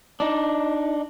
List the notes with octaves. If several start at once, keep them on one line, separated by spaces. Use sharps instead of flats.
D4 D#4